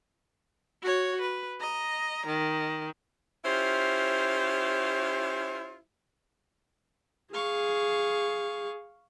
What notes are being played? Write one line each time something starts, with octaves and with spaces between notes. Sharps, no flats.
F#4 C#5
B4
D#5 A#5
D#3
C#4 E4 F4 G4 C5
G#4 F5 C#6